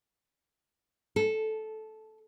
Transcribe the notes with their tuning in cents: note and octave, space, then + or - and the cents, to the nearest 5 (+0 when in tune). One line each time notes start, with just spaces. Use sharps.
A4 -10